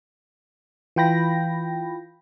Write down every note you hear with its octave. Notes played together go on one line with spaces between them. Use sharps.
E3 F4 G5 B5 A#6